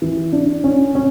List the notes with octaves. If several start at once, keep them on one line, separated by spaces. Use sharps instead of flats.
E3
D4
C#4
C#4